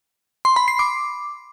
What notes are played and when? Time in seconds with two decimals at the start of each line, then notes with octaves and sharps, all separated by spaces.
0.45 C6
0.56 B5
0.68 C7
0.79 D6